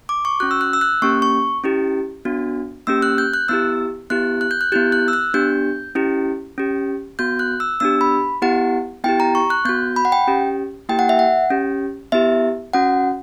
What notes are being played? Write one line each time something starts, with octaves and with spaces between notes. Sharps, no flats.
D6
C#6
C#4 F#4 F#6
E6
F#6
E6
F#6
A#3 C#4 G4 C#6
C#6
C#4 E4 G4
B3 D4 F#4
A#3 C#4 G4 E6
F#6
G6
F#6
B3 E4 G4 E6
B3 E4 G4 F#6
F#6
G6
F#6
B3 E4 G4 G6
F#6
E6
F#6
B3 D4 G4 G6
C#4 E4 G4
C#4 G4
B3 F#4 G6
F#6
E6
B3 D4 G4 E6
B5
B3 E4 G4 F#5
B3 E4 G4 G5
A#5
C#6
F#6
B3 F#4 G6
B5
F#5
G5
C#4 G4
A#3 E4 G4 G5
F#5
E5
F#5
C#4 G4
B3 E4 G4 E5
C#4 F#4 F#5